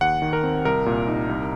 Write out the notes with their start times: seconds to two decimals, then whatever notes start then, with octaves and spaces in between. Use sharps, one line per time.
0.01 D#2 F#5
0.22 D#3
0.33 A#4
0.43 C4
0.65 C2 A#4
0.86 A#2
1.08 D#4
1.29 C2